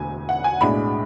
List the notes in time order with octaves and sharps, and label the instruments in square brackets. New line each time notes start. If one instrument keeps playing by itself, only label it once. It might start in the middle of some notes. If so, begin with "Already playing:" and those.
Already playing: [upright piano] E1 D2 D3 G#5
F#5
G#5
B1 A2 G#3 D4 B5